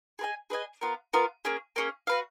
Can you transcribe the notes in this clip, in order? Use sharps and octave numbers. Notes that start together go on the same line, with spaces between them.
G#4 B4 D#5 G#5
G#4 B4 D#5 G#5
B3 F4 A#4
B3 F4 A#4
A#3 C#4 G#4
A#3 C#4 G#4
F#4 B4 F5